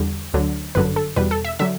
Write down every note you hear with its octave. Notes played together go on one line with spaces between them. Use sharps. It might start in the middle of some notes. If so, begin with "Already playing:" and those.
Already playing: E2 D3 G3
D2 D3 F#3
G1 F#2 D3 F#3 B4
A4
E2 B2 G3 B4
A4
E5
D3 F#3 E5